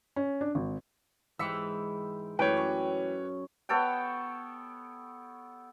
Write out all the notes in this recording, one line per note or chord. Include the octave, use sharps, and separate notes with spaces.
C#4
D4
G#1
G#2 E3 G5 E6 B6 C#7
F#2 E3 A3 B4 C#5 D5 G5
C#4
B3 A4 C#5 G5